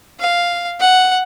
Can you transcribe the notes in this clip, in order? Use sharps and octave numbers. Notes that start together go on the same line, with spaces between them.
F5
F#5